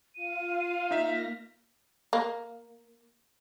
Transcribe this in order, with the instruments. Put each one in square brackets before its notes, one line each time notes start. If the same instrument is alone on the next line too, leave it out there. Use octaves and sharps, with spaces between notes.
[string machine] F4 F5 [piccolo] D#7
[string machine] A#3 A#6 [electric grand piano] D#4 E5 [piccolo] B6
[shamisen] A#3